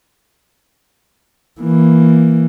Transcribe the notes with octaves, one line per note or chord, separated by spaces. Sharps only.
E3 A#3